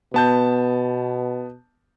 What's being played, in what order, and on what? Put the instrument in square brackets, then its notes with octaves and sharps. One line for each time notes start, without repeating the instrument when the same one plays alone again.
[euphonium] B2 [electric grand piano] B3 A5 G6